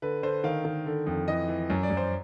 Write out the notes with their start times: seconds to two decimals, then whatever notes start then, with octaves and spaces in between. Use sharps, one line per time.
0.02 D3 B4
0.23 D3 C5
0.44 D#3 F5
0.65 D#3
0.86 D3
1.06 F2
1.28 E3 D#5
1.48 E3
1.70 F#2
1.83 D5
1.90 F#2
1.97 C5